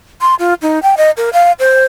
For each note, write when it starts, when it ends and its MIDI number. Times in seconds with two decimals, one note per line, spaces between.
0.21 0.35 84
0.39 0.54 65
0.62 0.79 63
0.83 0.95 79
0.97 1.11 75
1.17 1.30 70
1.33 1.52 77
1.59 1.85 72